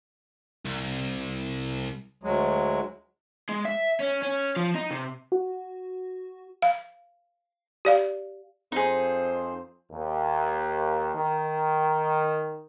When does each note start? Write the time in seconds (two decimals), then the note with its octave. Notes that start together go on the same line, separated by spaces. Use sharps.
0.66 C2
2.23 D2 F#3 G#3
3.49 G#3
3.65 E5
4.00 C#4
4.23 C#4
4.56 F3
4.75 D#4
4.91 C3
5.32 F#4
6.62 F5
7.85 G4 D5 F5
8.72 F2 D#4 G#4 C5
9.91 D#2
11.13 D#3